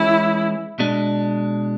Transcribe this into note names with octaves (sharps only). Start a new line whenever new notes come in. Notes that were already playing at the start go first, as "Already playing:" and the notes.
Already playing: E3 G#3 C#4 E4
B2 G#3 D4